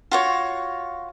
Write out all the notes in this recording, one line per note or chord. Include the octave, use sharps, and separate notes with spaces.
F4 F#4 C#5